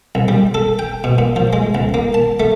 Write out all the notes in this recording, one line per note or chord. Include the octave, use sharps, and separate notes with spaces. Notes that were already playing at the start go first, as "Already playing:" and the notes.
C2
G3
A4
G5
B2
A#2
F3
G#3
C#2
A#3
A5
A3